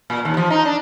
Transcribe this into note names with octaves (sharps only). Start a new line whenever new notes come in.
A#2
D#2
F3
D#4
D4